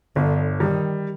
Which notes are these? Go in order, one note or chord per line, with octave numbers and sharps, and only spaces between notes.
G1 D3
D#3 G3